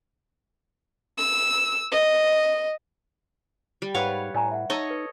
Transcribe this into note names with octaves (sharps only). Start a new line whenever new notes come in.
E6
D#5
G3
G#2 B4 C#5 F5 F#5
A2 D5 G#5 A#5
E5 F#5
D#4 A4 C#5 D#5
B4